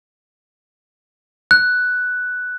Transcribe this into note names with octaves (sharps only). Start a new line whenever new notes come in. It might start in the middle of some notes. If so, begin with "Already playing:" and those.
F#6